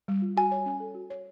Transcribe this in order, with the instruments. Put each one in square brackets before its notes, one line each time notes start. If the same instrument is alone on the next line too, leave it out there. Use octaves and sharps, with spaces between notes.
[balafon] G3
F4
[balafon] F#4 [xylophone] G#5
[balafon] C#5
C#4
A4
F#4
C#5